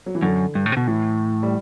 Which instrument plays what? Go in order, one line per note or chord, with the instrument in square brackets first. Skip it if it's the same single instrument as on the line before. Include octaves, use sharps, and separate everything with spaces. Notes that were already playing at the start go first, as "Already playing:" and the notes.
[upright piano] F#3
E3
[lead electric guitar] F#2 [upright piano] D3
[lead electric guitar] G2
A2
C3
B2
[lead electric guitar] A2 [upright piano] E3
[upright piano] G3